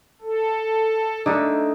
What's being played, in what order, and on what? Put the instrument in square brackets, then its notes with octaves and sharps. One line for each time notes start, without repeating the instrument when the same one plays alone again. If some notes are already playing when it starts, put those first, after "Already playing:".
[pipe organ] A4
[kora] D3 A3 [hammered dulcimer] D#4